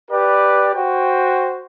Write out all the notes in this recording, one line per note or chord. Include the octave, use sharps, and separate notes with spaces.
G4 B4 D5
F#4 C5 G5